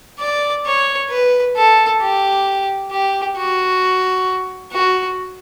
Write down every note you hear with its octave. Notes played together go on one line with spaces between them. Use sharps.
D5
C#5
B4
A4
G4
G4
F#4
F#4